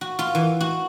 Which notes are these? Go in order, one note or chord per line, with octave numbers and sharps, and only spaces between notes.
F#4
F4
E3
F#4